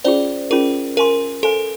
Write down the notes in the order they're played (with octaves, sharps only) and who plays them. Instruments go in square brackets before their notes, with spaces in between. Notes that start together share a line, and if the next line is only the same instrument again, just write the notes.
[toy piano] C#4 F4 G#4 [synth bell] C5 D5
[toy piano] C#4 F4 G#4 [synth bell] A#4
[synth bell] A#4 [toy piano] C5 F5 G#5 C6
[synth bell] A4 [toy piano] C5 F5 G#5 C6